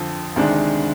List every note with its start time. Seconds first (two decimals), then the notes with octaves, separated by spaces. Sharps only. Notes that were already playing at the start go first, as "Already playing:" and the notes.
Already playing: F2 D3 F3
0.36 D2 C3 D#3 G#3 D4